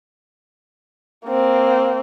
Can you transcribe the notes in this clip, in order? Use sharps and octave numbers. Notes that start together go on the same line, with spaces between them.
A#3 C4